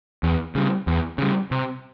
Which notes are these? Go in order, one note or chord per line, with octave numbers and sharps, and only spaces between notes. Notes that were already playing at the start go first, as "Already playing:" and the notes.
E2
C#3 G3
E2
C#3 G3
C3